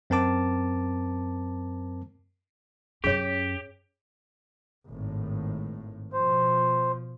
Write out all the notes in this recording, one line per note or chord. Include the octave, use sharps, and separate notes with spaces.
F#2 C4 A#4 A5 D6
F#2 C#4 G4 G#4 C#5
G#1 A2
B2 F3 C5